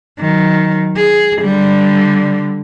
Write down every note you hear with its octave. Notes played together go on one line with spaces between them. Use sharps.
D#3 F#3
G#4
D3 G3